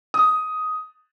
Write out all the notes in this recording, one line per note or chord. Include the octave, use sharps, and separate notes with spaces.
D#6